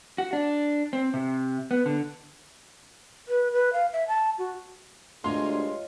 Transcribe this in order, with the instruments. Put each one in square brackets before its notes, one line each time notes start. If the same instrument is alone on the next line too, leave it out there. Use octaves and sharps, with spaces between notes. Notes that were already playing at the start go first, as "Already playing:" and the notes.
[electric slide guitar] F#4
D4
C4
C3
B3
D3
[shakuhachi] B4
B4
F5
E5
A5
F#4
[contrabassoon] D2 [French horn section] G2 G3 G#3 [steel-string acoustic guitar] F4 C#5 D#5 [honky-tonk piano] C6